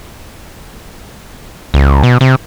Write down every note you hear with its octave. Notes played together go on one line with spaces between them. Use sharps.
C#2
B2
C3